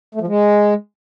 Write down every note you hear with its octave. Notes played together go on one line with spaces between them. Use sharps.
A3
F3
G#3